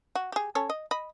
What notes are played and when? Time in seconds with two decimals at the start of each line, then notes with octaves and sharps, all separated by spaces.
0.15 F#4
0.32 G4 G#4
0.55 C#4 A4 C#5
0.70 D#5
0.91 D#5 B5